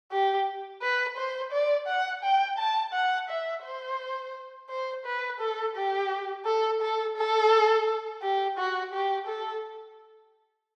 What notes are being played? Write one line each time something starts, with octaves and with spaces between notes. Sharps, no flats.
G4
B4
C5
D5
F#5
G5
A5
F#5
E5
C5
C5
B4
A4
G4
A4
A4
A4
G4
F#4
G4
A4